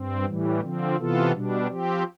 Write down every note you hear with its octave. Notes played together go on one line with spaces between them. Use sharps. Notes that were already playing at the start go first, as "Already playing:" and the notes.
Already playing: G2 C4
A2 E3 G3
D3 F3 C4
C3 E3 B3 F4 A4
B2 G3 D4
F3 C4 G4